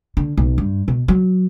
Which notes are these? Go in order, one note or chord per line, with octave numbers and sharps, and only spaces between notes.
D3
B1
G2
B2
F#3